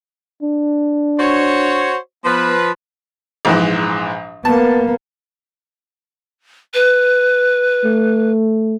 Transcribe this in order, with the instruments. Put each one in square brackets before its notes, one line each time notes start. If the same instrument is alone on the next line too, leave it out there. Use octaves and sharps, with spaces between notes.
[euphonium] D4
[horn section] F#4 C5 C#5
[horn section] F3 B4 [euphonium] B3
[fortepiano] A#1 G#2 E3
[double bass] A#3 B3 [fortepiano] A5
[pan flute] B4
[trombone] A3